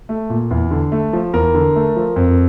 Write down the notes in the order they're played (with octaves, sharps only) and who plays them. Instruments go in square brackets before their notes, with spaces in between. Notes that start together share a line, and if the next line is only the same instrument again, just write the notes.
[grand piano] A3
A#2
E2
D3
A3
F3
E2 A#4
D3
A3
F3
F2